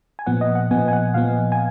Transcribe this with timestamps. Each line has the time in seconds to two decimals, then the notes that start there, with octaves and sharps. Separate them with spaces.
0.19 G#5
0.26 A#2 F3 B3 F#5
0.41 D#5
0.55 F#5
0.71 A#2 F3 B3 G#5
0.88 G#5
0.93 F#5
1.14 A#2 F3 B3 F5
1.52 G#5